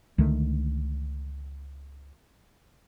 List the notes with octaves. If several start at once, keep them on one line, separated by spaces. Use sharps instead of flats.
C#2 D3 D#3 A3